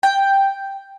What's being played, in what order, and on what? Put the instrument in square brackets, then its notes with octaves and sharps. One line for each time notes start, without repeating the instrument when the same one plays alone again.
[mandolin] G5